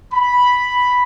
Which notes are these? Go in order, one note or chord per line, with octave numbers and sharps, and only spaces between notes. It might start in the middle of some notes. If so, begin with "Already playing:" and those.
B5